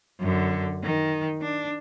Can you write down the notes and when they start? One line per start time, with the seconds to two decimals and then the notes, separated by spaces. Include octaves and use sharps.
0.20 F#2 D3
0.83 D#3
1.42 D4